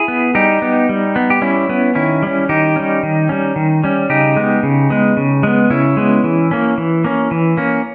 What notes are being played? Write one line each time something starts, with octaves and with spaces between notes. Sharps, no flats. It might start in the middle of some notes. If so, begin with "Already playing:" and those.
Already playing: E4 G#4
B3
G3 D#4 G4
B3
G3
B3
G4
G3 C#4 E4
B3
D#3 C#4 E4
G3 C#4
D#3 D#4 G4
G3 C#4
D#3
G3 C#4
D#3
G3 C#4
C#3 D#4 G4
G#3 B3
C#3
G#3 B3
C#3
G#3 B3
C#3 C#4 E4
G#3 B3
E3
A#3 C#4
E3
A#3 C#4
E3
A#3 C#4